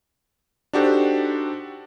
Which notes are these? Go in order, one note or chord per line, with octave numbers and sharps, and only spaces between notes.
D4 D#4 F#4 G4 A4 C5